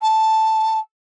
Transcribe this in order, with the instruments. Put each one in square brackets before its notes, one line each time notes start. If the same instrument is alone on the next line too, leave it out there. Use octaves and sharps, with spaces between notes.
[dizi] A5